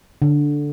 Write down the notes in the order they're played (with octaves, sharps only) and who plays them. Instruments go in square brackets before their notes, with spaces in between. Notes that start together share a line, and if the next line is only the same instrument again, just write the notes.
[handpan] D3